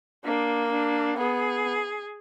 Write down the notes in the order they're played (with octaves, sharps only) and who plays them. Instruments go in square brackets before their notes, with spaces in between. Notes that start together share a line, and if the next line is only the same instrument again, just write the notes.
[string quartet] A#3 [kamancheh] D4
[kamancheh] D4
[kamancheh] B3 [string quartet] G#4